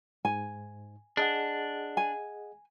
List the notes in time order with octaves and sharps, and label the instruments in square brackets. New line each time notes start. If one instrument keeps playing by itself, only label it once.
[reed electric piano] G#2 [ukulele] G#5
[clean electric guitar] D4 [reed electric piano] G#4 D#5 F#5
[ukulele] G#5